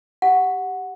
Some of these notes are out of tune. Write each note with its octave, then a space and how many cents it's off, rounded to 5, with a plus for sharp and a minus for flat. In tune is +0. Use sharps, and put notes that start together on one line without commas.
G4 +0 F#5 -5